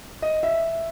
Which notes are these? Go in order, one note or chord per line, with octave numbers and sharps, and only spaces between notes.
D#5
E5